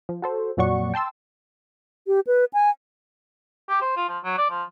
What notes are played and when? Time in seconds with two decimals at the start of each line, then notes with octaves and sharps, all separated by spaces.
0.09 F3
0.22 F#4 A4 C5
0.57 F2 A#2 F#3 D5 F#5 C#6
0.94 G5 A5 C6 E6
2.07 G4
2.27 B4
2.53 G#5
3.69 G4
3.81 C5
3.96 F4
4.09 F3
4.24 F#3
4.38 D5
4.50 F3